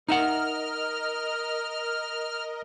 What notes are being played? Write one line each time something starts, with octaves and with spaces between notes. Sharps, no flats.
D#4 A#4 D#5 E5 F#5 F6